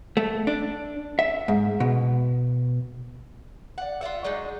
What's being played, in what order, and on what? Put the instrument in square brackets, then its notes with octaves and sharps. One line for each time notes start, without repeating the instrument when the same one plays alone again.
[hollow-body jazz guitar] A3
D4
E5
G#2
B2
[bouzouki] D5 F#5
F4 D5 E5 F#5
F#3 G#3 D4 D#4